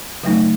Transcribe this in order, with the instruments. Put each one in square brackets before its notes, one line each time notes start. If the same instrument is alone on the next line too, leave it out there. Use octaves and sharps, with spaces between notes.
[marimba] C#3 F#3 A3 D#4